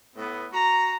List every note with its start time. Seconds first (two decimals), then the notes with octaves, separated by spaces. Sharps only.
0.16 A2 B3
0.52 F#4 A#5